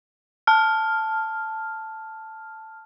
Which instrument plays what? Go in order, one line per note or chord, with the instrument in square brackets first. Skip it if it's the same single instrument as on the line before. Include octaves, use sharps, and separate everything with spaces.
[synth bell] A5 F6